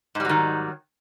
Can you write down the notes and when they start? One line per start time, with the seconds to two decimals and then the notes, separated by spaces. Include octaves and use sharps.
0.15 G#2
0.20 G3
0.25 F#3
0.29 D#3